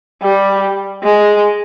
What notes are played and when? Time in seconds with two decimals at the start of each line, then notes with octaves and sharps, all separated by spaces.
0.23 G3
1.04 G#3